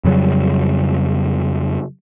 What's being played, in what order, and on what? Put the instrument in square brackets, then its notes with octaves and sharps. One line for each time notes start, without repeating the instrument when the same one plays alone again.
[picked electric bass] F2 C#3 F#3 G3